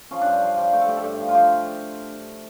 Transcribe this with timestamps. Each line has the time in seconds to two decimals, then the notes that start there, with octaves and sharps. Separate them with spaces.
0.11 F3 C#4
0.21 G2 D4
0.41 F3 F4
0.57 F3 G4
0.73 A3 G4
0.81 A4
0.88 A3 G4
0.97 A4
1.04 G2 G4
1.19 F3
1.29 F4
1.34 F3 G4